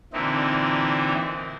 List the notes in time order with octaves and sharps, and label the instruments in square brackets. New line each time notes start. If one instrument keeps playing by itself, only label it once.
[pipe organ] A#2 D3 E3 C4 D#4 E4